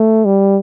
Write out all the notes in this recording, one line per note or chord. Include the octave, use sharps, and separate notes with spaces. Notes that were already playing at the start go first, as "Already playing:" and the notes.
Already playing: A3
G3